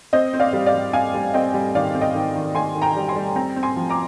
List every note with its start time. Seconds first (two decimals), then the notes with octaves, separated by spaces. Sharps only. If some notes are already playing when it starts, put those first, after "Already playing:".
0.13 C4 C5 D#5
0.34 C4
0.40 D5 F5
0.53 G3
0.66 D5 F5
0.74 G3
0.93 C4 F5 G#5
1.14 G3
1.34 C4 D#5 G5
1.54 G3
1.75 D#3 D5 F5
1.95 C4
2.01 D#5 G5
2.15 D#3
2.35 D#3
2.55 D#3 G#5 C6
2.76 D#3
2.82 G5 A#5
2.96 G3
3.08 G#5 C6
3.16 G3
3.36 C4 G5 A#5
3.56 C4
3.63 G#5 C6
3.76 F3
3.89 A#5 D6